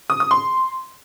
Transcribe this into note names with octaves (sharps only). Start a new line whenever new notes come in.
D#6
D#6
C6